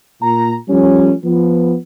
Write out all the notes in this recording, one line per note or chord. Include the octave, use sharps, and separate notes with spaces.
A#2 A#5
F3 G3 A3 C#4
F3 B3